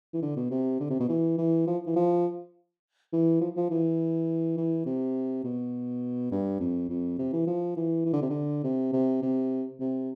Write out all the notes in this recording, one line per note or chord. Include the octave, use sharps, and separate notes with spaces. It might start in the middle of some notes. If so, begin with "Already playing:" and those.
E3
D3
B2
C3
D3
C3
B2
E3
E3
F3
E3
F3
E3
F3
F3
E3
E3
C3
B2
G2
F2
F2
C3
E3
F3
E3
E3
D3
C3
D3
C3
C3
C3
C3